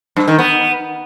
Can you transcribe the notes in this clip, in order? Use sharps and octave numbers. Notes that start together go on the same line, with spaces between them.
G2
D#3
B3